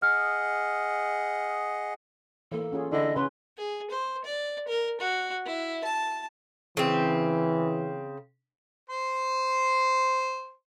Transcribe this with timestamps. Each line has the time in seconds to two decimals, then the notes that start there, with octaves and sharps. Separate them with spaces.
0.02 G#4 D#5 F#5 F6
2.52 E3 A#3 A4
2.73 C#4 F4 G#4
2.92 D3 E4 D#5
3.16 C#3 C#4 B4 C6
3.58 G#4
3.91 C5
4.24 D5
4.68 A#4
5.00 F#4
5.45 E4
5.84 A5
6.77 C#3 E3 C4
8.90 C5 C6